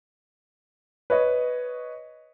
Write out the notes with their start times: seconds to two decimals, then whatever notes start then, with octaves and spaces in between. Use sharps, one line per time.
1.10 B4 C#5 D#5